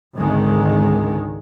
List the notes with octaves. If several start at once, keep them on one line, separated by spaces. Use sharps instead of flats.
G#1 C#2 D3 D#3 G#3